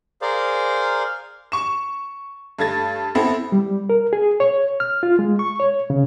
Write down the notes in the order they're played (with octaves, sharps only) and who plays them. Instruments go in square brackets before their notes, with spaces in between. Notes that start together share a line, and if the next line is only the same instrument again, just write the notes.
[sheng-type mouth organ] G#4 A#4 C5 D5 F5
[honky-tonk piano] C#6 E7
G2 A3 G#6 A6
B3 C4 E4 A4
[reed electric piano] G3
A#4
G#4
C#5
F6
F4
G#3
C#6
C#5
C#3